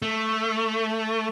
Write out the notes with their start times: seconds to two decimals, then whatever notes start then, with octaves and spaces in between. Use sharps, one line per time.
0.02 A3